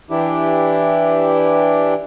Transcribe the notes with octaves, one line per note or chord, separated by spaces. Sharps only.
E3 D4 E4 G4